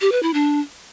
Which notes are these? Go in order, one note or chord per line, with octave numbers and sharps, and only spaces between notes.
G4
B4
E4
D4